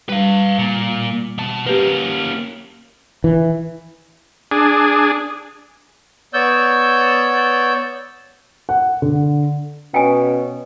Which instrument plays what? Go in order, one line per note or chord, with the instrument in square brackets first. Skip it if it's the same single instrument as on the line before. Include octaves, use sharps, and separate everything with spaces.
[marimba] G3 [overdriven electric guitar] B4 F5
[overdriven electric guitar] A#2
B2 A5
[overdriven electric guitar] A#3 C#4 [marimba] G4 B4
[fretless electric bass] E3
[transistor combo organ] D4 G#4
[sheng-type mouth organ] B3 C#5 D5 E6 G6
[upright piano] F#5
D3
[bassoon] B2 [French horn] C#4 [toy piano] G5 G#5